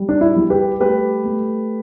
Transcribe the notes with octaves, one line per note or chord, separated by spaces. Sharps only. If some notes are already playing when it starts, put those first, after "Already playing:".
Already playing: G3
D4
E4
G3
G4 B4
A3 G4 B4
A3